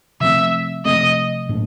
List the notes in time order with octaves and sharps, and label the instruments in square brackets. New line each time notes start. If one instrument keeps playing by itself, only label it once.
[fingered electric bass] C3 F3 A3 C4 [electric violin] E5
[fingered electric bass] C3 F3 A3 C4 [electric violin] D#5
[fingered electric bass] A2 F#3 A#3 D4